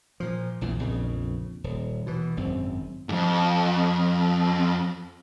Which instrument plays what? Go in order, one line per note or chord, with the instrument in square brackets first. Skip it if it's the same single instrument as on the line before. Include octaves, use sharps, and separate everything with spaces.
[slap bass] A#2 F3
A#1 E2 A#2 E3
A#1 F2 C#3
D#1
B2 E3
G#1 F#2 C4
[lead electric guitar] F2 G#2